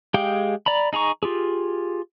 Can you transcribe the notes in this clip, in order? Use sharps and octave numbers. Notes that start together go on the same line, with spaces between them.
G#3 G4 G#4 F5 G5
D5 A#5 B5
D#4 G#4 A#5 C#6
F4 G4 G#4